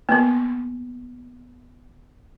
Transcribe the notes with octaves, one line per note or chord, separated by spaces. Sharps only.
A#3 B3